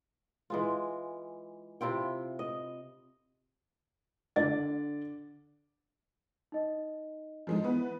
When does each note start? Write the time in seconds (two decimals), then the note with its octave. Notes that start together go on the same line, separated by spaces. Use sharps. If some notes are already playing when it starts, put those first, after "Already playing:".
0.50 E3 G#3 F4
1.81 C3 E4 F4 G5
2.39 D#5
4.36 D3 D5 A6
6.52 D#4 D#5
7.47 F3 G#3 D#4
7.64 E3 B3 B4